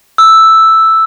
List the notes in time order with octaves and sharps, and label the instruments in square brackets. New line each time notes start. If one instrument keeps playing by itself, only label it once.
[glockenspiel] E6